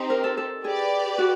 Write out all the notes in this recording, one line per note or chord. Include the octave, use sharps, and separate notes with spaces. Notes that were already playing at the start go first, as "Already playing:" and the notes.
Already playing: C4 D#4 G4 C5
A#4
A4
A4
G4 G#4 B4 D5
F#4